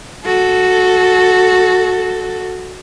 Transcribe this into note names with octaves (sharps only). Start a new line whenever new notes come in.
F#4 A4